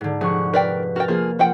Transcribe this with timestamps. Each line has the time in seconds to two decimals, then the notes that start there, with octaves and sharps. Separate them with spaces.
0.01 G#2 D3
0.21 F1 G#4 F#5 C#6
0.54 A#4 B4 D5 G5
0.96 F#4 A#4 G5 F6 A6
1.08 F3 A#3 G#4
1.39 F3 F#5 G5